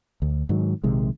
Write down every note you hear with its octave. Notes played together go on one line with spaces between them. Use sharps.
D2
G#2 D#3 F#3
A#1 C3 D#3 G#3